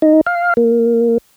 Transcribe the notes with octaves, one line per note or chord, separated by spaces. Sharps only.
D#4
F5
A#3